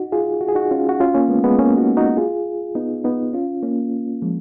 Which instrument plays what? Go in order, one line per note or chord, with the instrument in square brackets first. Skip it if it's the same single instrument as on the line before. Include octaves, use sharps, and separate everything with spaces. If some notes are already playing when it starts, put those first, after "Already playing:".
Already playing: [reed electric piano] D#4 F#4
F4 G#4
F#4
G#4
D#4 F#4
C#4 F4
F#4
C#4 F4
A#3 C#4
G#3 B3
G#3 B3
A#3 C#4
D#4 F#4
D#4 F#4
F4 G#4
B3 D#4
B3 D#4
C#4 F4
A#3 C#4
F3 G#3